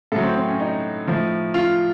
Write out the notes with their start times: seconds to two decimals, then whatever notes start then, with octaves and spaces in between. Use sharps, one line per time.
0.12 A2 A4
0.16 F#3
0.23 C4
0.36 C4
0.48 C#4
0.60 D#4
1.08 A2 F3
1.54 F4